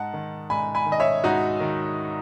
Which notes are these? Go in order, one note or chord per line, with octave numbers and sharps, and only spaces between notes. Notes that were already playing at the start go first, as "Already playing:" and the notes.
Already playing: G#2 F#5 A5
D#3
G#2 G#5 B5
G#5 B5
D#3
D#5
C#5 E5
G#2 D#4 F#4
D#3